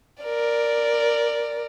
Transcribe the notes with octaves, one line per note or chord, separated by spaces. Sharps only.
A#4 D5